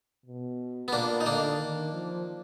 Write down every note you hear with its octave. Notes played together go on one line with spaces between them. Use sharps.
B2
B3
A#2 A#3 D4
D#4
D3 A#3 D4
D#3
F3